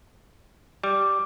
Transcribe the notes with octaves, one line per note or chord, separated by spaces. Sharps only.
G3 D6